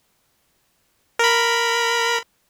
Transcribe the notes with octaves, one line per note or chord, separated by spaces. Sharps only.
A#4 B5